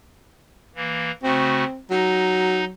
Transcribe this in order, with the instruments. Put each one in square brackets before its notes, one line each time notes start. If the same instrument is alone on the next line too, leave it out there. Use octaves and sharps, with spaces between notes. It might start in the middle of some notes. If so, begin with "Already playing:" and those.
[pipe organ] E3 A#3
[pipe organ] C#3 A3 F#4 [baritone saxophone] C4
[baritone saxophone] F#3 [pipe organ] D#4